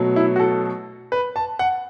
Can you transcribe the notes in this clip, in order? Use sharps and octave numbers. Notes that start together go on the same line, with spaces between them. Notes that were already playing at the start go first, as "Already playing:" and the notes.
Already playing: B2 F#3 A3
E4
F#4
A4
B4
A5
F#5